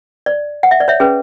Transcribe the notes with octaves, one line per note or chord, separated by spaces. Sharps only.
D5
F#5
E5
D5
C#5 E5
C#4 G#4 B4